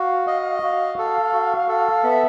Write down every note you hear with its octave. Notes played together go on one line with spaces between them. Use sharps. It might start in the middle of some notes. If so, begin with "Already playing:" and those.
Already playing: F#4 F5
D#5
F#4 F5
A4
F#4
A4
B3 E5